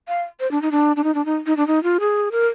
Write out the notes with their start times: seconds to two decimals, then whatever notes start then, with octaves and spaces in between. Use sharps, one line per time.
0.08 F5
0.40 C5
0.51 D4
0.62 D#4
0.72 D4
0.96 D4
1.04 D#4
1.15 D4
1.26 D#4
1.47 D#4
1.57 D4
1.67 D#4
1.83 F4
2.00 G#4
2.32 A#4